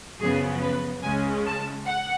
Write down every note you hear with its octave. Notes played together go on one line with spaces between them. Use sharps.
F#2 C#3 F3 B3 G#4
B4
C#2 C#3 G#3 C#4 G#5
A5
F#5